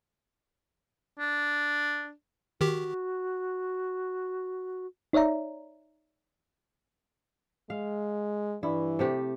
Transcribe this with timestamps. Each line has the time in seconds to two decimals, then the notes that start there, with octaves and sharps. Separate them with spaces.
1.19 D4
2.61 D#3 F#4 G4
5.13 D#4 C#5 D5 E5 A#5
7.70 G#3 F5
8.63 G2 E3 E4
8.99 C3 A3 G4